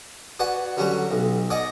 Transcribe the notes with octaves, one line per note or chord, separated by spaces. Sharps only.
F#4 B4 D5 F#5 G#5
D3 F#3 G3 C#4 F#4
B1
D5 D#5 F#5 G#5 D6 D#6